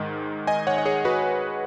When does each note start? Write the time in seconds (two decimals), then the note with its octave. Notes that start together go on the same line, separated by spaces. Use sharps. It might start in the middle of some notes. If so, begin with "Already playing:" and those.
Already playing: G#2 D#3 G#3
0.47 D#5 G#5
0.67 C#5 F#5
0.78 D#5
0.86 G#4 C#5
1.05 F#4 B4